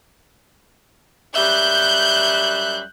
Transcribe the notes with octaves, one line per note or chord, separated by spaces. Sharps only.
F#2 G3 E5 F#6 G6